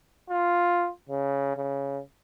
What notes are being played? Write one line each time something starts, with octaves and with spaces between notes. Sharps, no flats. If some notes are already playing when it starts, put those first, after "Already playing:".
F4
C#3
C#3